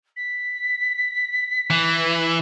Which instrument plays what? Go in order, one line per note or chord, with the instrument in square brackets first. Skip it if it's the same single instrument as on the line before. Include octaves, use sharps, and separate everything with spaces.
[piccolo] B6
[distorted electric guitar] E3